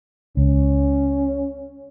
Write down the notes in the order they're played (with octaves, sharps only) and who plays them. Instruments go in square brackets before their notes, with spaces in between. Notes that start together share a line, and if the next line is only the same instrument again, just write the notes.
[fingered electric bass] C#2 [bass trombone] C#4